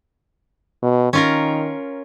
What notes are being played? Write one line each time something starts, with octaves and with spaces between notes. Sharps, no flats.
B2
D#3 C#4 F4 A#4